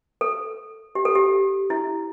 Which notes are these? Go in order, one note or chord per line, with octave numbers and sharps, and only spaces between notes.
A4
G4
A4
G4
E4